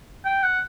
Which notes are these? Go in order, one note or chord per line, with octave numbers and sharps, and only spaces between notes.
G5
F#5